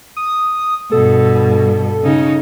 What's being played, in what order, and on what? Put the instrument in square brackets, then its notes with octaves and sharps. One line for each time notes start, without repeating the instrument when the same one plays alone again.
[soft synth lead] D#6
[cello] G2 B2 [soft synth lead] A4
[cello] C#3 D#4